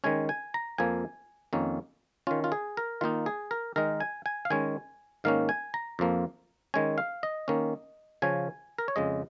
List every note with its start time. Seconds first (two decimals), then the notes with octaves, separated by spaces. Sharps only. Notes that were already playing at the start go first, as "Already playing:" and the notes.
0.04 D#3 G#3 C#4 G#5
0.29 G#5
0.54 A#5
0.78 F2 F3 A#3 G#5
1.53 F2 D#3 A#3 C#4
2.27 D#3 C#4 F4
2.44 F4
2.52 G#4
2.77 A#4
3.01 D#3 A#3 D#4 F4
3.26 G#4
3.51 A#4
3.76 D#3 G#3 D#4 A#4
4.00 G#5
4.26 G#5
4.45 F5
4.50 D#3 G#3 C#4 G#5
5.24 G#2 D#3 A#3 C#4 F5
5.49 G#5
5.74 A#5
5.99 F2 F3 A#3
6.74 D#3 G#3 C#4 G#5
6.98 F5
7.23 D#5
7.48 D#3 A#3 C#4
8.22 C#3 F3 C#4 G#5
8.78 A#4
8.88 C#5
8.96 F2 C#3 G#3 D#5